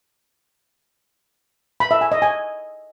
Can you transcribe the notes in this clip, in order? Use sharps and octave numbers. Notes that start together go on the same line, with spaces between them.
B5
E5
G#5
D#5
G#5